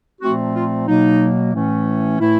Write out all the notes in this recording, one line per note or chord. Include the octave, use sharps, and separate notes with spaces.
A#2 F3 A3 C4 F#4
F4
B2 F#3 A#3 D#4
A2 E3 A3 C#4
A2 E3 A3 E4